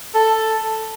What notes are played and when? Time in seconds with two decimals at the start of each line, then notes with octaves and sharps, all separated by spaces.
0.15 A4